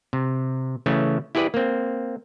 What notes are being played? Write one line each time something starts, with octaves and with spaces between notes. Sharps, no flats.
C3
C#3 E3 A3 C#4
E4 G4 G#4 B4 D5
A#3 C4